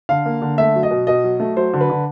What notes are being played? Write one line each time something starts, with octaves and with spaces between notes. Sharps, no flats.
D3 F5
A#3
D3
A3 E5
F#3
D#5
B2
B2 D#5
F#3
A3
F#3 C5
D3
B4
D3